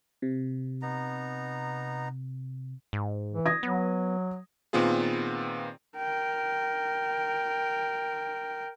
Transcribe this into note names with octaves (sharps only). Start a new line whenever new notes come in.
C3
B3 D#4 A#5
G#2
E3
D#6 G#6 A#6
F#3 B3
A#2 D#3 B3 C4 F4 G#4
A#4 G5